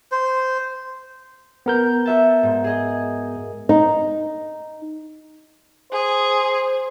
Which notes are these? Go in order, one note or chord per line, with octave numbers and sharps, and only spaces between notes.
C5
B3 A#4 G6
F#4 E5 A5
G#2
G#4 D#5
D#4
G#4 C5